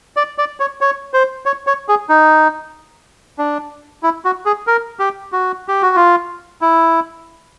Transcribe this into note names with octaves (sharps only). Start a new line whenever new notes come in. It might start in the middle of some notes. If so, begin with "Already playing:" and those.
D5
D5
C#5
C#5
C5
C#5
C#5
G#4
D#4
D4
E4
F#4
G#4
A#4
G4
F#4
G4
F#4
F4
E4